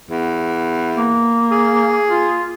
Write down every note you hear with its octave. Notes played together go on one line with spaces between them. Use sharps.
E2
A#3
G#4
F4